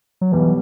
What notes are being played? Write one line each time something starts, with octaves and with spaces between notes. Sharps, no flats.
F#3
B1 B2 E3 G3